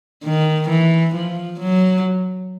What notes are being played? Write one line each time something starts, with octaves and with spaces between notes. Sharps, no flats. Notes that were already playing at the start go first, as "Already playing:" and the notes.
D#3
E3
F3
F#3